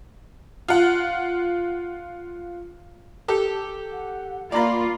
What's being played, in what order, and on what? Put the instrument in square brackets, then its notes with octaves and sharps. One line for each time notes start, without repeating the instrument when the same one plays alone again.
[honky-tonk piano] F4 F#5
[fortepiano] G4 A4
[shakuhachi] F#5
[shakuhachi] A#3 [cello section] F4 [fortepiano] D5 A#5 B5